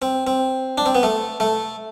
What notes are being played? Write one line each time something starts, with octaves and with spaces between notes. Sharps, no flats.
C4
C4
D4
C4
B3
A3
A3